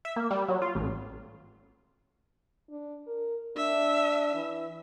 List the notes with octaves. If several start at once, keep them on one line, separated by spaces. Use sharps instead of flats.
E5
A#3
G3
F#3
F4
A1
D4
A#4
D4 E5
E3